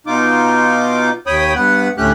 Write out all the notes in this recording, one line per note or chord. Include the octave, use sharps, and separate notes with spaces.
B2 D#4 F4 D6
D#2 C#5 G5 B5 D#6
G2 B3 B4 F#5
D2 A2 A3 C#4 G4 F#6